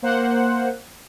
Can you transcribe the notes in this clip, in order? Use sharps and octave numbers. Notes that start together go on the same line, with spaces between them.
A#3 C5 F#5